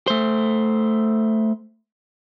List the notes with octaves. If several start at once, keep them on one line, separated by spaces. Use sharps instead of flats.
A3 C5